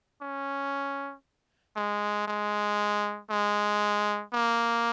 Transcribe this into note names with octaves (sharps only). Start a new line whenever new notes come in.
C#4
G#3
G#3
G#3
A#3